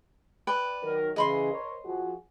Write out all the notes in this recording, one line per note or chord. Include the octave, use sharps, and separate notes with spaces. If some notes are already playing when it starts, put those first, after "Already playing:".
B4 D5 G5
D#3 F#3 A#4
C#3 E3 G#4 D#5 B5 C6
A#4 C5 C#5
F3 F#4 G#4